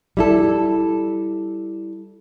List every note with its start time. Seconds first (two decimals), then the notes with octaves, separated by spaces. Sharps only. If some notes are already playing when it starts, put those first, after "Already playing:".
0.17 G3 E4 A4